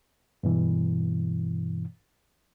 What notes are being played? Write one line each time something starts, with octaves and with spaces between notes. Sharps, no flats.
G2 B2 E3